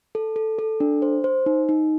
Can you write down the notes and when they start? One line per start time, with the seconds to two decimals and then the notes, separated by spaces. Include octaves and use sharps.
0.15 A4
0.36 A4
0.59 A4
0.80 D4
1.02 C5
1.24 C5
1.46 D#4
1.69 D#4